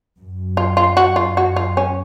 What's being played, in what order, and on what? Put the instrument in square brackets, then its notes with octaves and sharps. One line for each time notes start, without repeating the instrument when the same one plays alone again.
[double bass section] F#2
[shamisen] F4
F4
F#4
F4
F#4
F4
C#4